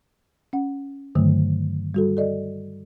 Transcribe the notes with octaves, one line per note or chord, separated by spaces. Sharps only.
C#4 F#5
G2 D3 D#3 F#3 A3
G3 F#4 A4
A4 D5 D#5